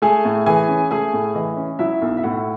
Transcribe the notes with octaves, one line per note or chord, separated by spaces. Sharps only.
A3 G#4 G#5
A2
E3 G#4 G#5
C#4
A3 G#4 G#5
A2
E3 D#5
C#4
F#3 E4 E5
B1
E5
A2 F#4 F#5